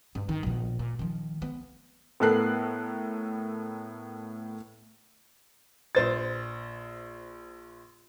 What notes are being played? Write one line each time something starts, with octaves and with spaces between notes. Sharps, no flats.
G2 C#4
D#3
A#1 B2
A#2
D#3 F3
B3
A2 B3 A4 A#4 F#6 C7
A#1 C5 A6